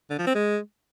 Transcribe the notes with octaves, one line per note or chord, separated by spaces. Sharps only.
D3
F3
C4
G#3